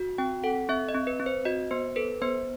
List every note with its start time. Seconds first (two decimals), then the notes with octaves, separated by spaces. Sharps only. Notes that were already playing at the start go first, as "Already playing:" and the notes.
Already playing: F#4
0.18 C4 G5
0.44 A4 F#5
0.69 C4 E5
0.89 D#5
0.94 C4
1.07 B4
1.20 C4
1.26 C5
1.45 F#4 D#5
1.71 B3 C5
1.96 A4 B4
2.22 B3 C5